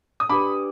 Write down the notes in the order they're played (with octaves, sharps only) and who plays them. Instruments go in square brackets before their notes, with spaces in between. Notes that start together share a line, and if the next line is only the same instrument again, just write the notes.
[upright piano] D#6
[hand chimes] D4 G4 B4 [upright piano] B5 D6